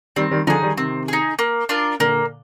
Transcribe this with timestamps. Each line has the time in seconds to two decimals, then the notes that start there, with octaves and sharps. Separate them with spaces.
0.16 D#3 G3 C4
0.31 D#3 G3
0.47 D3 F3 D#4 G#4
0.62 D#3 G3
0.77 C3 D#3 C4
1.08 D#4 G#4
1.39 A#3
1.69 D4 F4 A#4
2.00 A#2 D3 A#3